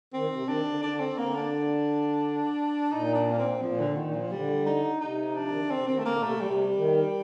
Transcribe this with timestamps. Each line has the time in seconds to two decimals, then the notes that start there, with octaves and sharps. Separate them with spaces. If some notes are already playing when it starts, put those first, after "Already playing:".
0.13 D#3 C4
0.31 C3
0.48 D#3 D4
0.66 D3
0.83 D3 D4
1.00 C4
1.18 D3 A#3
1.35 D4
2.92 A#2 D#4
3.15 D4
3.31 A#3
3.39 C4
3.62 A#2 F3
3.80 D3
3.97 A#2 D#3
4.14 F3
4.32 D3 G3
4.66 D#4
5.01 C3 D#4
5.36 F3 D4
5.48 D#3
5.60 D3
5.71 C3 C4
5.88 D#3 C4
5.99 A3
6.05 D3 A#3
6.15 A#2
6.23 C3 A3
6.36 A#2
6.41 C3 G3
6.76 D#3